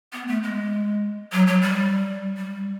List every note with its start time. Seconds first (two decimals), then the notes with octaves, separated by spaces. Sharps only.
0.13 B3
0.28 A3
0.43 G#3
1.32 F#3
1.47 F#3
1.62 G3
2.37 G3